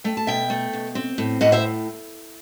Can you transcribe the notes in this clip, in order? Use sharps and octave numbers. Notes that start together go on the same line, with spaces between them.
A3 G5
A5
B2 E5 G5
A3
B2
C4
A2
A2 D#5 F#5
C5 E5